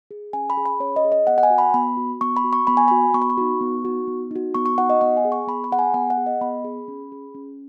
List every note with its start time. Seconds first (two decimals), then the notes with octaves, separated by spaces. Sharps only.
0.11 G#4
0.33 C#4 G#5
0.50 B5
0.57 G#4
0.66 B5
0.80 C#4 C#5
0.96 D#5
1.05 G#4
1.12 D#5
1.27 B3 F#5
1.38 F#5
1.43 G#5
1.50 F#4
1.58 B5
1.74 B3 B5
1.97 F#4
2.21 B3 C#6
2.37 B5
2.44 F#4
2.53 C#6
2.67 B3 B5
2.77 G#5
2.88 F#4 B5
3.14 B3 C#6
3.22 B5
3.30 C#6
3.38 D#4 F#4
3.61 B3
3.85 D#4 F#4
4.08 B3
4.31 D#4 F#4
4.54 B3 C#6
4.66 C#6
4.78 D#4 F#4 F#5
4.90 D#5
5.01 B3 F#5
5.17 G#5
5.25 G#4
5.32 C#6
5.47 B3 B5
5.64 B5
5.72 G#4 F#5
5.79 G#5
5.94 B3 F#5
6.10 F#5
6.17 G#4
6.26 D#5
6.41 B3 B5
6.64 G#4
6.88 C#4
7.12 G#4
7.35 C#4